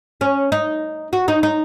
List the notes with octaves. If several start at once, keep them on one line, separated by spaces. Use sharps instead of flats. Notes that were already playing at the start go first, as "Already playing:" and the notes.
C#4
D#4
F#4
D#4
D#4